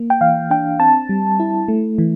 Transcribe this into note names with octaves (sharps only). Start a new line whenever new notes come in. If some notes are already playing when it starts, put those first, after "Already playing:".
Already playing: A#3
G5
E3 F5
D4 G5
C4 A5
G3
E4
A3
E3